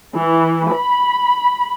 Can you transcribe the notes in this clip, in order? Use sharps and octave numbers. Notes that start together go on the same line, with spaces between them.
E3
B5